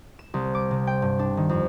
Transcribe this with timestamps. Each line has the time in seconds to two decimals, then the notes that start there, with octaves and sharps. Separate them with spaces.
0.19 E7
0.34 C2
0.55 D6
0.71 C3
0.87 G5
1.02 G2
1.19 D4
1.37 D#3
1.49 F2